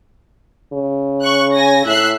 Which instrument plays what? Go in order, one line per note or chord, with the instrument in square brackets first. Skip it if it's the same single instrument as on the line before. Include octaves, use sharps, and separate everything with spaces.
[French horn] C#3
[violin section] C#6 F#6
G#5 A#6
[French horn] A2 [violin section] E5 F#6 C7